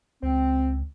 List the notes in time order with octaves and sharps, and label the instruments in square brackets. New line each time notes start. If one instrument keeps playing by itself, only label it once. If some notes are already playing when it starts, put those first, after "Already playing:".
[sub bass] C#2 [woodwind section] C4